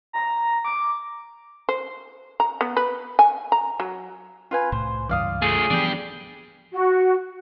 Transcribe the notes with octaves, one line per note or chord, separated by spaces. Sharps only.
A#5
D6
C5
A#5
B3
B4
G#5
A#5
F#3
F4 B4 G#5
C2 A2 C5
C#2 G2 E3 D5 F5 D#6
A3 F4 G#4
E3 F3 B3 D4 G4
F#4